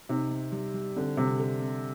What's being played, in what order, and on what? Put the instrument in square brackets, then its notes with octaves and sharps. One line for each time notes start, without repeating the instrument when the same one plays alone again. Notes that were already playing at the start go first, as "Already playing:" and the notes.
[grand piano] C3 [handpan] D#4
[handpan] C4
G3
G3
[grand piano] D3 [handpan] C4
[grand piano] C3 [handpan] G3
[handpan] A4
C4